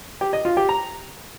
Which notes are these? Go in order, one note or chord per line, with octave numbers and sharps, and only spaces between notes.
G4
D#5
F4
G4
A#5